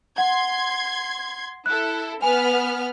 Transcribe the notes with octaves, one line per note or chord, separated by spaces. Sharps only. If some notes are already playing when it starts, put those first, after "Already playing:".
F#5 C6 G#6
E4 A4 F#6
B3 B4 G#5 F6